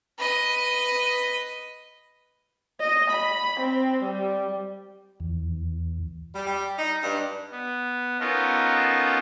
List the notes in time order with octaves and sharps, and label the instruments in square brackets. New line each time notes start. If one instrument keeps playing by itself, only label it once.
[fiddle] B4 D#5
[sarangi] D#5
B5
C4
G3
[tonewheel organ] E2
[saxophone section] G3
G3
D#4
G2
[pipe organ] B3
B3 C#4 D#4 F4 A4 A#4